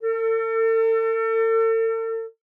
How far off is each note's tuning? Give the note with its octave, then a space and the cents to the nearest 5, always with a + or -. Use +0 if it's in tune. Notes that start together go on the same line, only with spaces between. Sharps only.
A4 +40